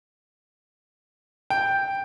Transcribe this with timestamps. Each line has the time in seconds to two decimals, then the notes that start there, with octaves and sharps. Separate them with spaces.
1.50 G5